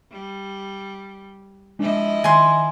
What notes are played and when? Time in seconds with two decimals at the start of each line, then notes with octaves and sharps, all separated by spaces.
0.12 G3
1.79 F3 G#3 D4 E4 D#5
2.24 D#3 G#5 C6